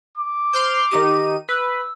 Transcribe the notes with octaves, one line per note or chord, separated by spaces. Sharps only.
D6
C5 C6 F6 G6
D#3 D#4 G4 D#7
B4 E6